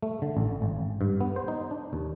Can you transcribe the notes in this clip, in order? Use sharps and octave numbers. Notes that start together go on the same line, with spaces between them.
A3
D3
A1
G#1
G2
B3
C5
D#4
D4
D#2